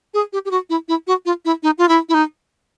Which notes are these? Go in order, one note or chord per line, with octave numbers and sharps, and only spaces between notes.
G#4
G4
G4
F#4
E4
E4
F#4
F4
E4
D#4
F4
E4
E4
D#4